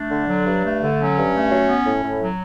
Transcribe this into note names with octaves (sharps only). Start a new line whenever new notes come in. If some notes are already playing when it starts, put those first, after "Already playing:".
Already playing: A3 D4
D3
F#3
G2
A3
D3
F#3 C#4
G2
A3
F#3
B3
A2
A2
F#3